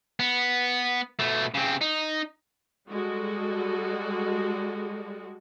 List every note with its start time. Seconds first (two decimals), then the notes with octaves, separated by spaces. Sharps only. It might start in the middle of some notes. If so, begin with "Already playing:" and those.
0.20 B3
1.19 B2 A3
1.55 C#3 C4
1.81 D#4
2.89 G3 G#3 F#4 A4